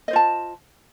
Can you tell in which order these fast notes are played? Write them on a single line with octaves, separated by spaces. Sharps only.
D#5 C5 F4 A5